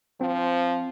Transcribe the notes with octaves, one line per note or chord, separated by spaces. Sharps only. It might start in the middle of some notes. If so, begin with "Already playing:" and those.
F3 C4